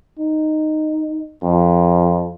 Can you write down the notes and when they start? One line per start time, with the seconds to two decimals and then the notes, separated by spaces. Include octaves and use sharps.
0.19 D#4
1.43 F2